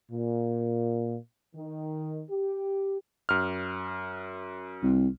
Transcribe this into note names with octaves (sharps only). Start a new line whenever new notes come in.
A#2
D#3
G4
F#2 F6
C2